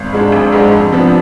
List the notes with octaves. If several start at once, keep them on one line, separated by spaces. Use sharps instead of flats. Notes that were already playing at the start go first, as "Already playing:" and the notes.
Already playing: G#1
G#2 G#3 D4
G#1
G#2 G#3 D4
F2
C3 F3 B3 D4